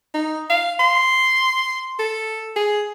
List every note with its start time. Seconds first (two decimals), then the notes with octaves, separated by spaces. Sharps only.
0.14 D#4
0.49 F5
0.79 C6
1.99 A4
2.56 G#4